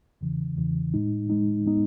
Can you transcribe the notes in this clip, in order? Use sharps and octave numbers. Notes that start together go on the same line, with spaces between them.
E2 C#3 E3
E2 C#3 E3
A2 G#3 D#4
A2 G#3 D#4
A2 G#3 B3 D#4